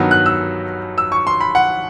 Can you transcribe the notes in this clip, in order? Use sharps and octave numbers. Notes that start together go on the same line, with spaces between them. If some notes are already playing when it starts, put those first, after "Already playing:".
Already playing: G2 D#3 F#3 B3 D#4
F#6
E6
E6
C#6
C6
B5
F#5